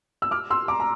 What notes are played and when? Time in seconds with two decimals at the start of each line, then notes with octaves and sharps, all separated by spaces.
0.22 E6
0.31 D6 F6
0.50 C6 E6
0.68 A#5 D6
0.80 A#5